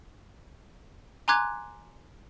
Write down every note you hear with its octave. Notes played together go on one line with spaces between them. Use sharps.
G#5 A#5 C6 D6 F#6 G#6